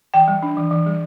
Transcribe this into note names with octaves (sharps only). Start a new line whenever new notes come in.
E3 G5
G3
D4
E3
E3
G3